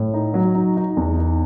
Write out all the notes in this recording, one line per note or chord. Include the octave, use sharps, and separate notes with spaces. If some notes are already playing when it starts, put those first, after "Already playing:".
Already playing: A2
D#4
F#3
D#4
D#4
E2
D#4